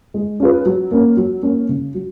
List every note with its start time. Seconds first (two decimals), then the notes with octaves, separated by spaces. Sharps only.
0.14 G#3
0.40 C#4 F4 G#4 B4
0.65 F#3
0.91 A#3 C#4
1.17 F#3
1.42 A#3 C#4
1.69 C#3
1.94 F#3